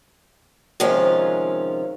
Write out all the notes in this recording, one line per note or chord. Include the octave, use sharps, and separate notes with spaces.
C3 D#3 F3 G#3 C#4 F4